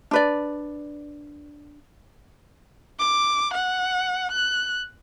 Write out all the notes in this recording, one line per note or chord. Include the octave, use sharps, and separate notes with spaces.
D4 B4 D5
D6
F#5
F#6